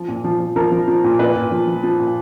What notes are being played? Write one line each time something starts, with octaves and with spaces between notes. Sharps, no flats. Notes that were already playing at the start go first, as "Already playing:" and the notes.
Already playing: F3
A#2
F3
F3
F3 A#4
F3
F3
A#2
A#2 B4
A#2
F3
F3
F3
A#2